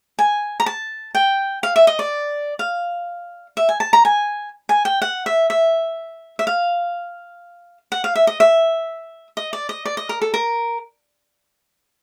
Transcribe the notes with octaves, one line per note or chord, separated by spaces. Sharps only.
G#5
A#5
A5
G5
F5
E5
D#5
D5
F5
E5
G#5
A5
A#5
G#5
G#5
G5
F#5
E5
E5
E5
F5
F#5
F5
E5
D#5
E5
D#5
D5
D#5
D5
D#5
A#4
A4
A#4